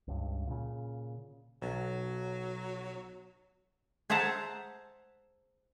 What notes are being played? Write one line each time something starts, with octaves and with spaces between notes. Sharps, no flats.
C#2 G2
A#2 C#3
B1 F#3
G#4 C5 E5 F#5 A5 A#5